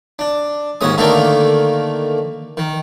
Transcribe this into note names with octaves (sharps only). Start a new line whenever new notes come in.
D4
D#2 G#2 C#4 D#6
D3 D#3 A3 A#3 A4 A#4
D#3